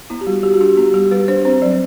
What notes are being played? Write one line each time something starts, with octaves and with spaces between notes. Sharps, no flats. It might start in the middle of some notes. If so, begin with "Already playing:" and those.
B3 E4
G4
G3 F#4
G3 G4
F#4
D4 G4
B3 G4
G3 G4
G3 B4
D4 C5
C4 C5
F#3 D5